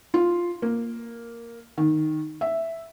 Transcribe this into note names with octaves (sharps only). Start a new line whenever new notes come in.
F4
A#3
D#3
E5